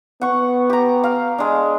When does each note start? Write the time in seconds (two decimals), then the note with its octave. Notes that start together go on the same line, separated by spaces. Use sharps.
0.21 B3 F#5 C#6
0.70 G4 A#5
1.04 F5
1.38 G#3 D4